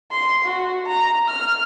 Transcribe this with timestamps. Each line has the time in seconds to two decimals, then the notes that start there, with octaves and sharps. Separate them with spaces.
0.12 C6
0.45 F#4
0.87 A#5
1.29 F6